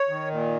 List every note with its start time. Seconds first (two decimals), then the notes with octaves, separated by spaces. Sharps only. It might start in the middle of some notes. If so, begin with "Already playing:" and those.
Already playing: C#5
0.09 D#3
0.31 A#2